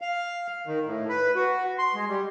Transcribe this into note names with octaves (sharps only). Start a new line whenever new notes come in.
F5
D#3
A2
B4
F#4
C6
G#3
G3